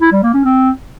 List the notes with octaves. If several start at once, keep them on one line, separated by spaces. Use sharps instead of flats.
E4
G3
A#3
C#4
C4